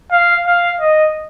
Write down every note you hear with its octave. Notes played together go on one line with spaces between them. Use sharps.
F5
F5
D#5